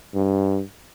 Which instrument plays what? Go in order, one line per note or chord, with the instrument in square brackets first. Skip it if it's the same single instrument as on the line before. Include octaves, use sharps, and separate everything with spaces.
[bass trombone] G2